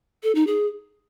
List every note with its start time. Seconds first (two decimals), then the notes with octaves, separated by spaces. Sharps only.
0.23 A4
0.35 D#4
0.47 G#4